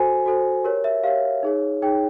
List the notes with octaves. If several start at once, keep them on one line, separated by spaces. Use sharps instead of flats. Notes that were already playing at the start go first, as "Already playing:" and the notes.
Already playing: F#4 A4 C5 G#5
F#4 A4 C5
G4 A#4 C#5
E5
G4 A#4 C#5 F5
D#4 G#4 C#5
D#4 G#4 C#5 G5